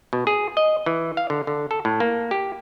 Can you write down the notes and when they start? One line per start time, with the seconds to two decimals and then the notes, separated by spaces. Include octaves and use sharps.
0.13 B2
0.27 G#4
0.57 D#5
0.86 E3
1.17 F5
1.30 D3
1.47 D3
1.71 A4
1.85 A2
2.00 A#3
2.31 G4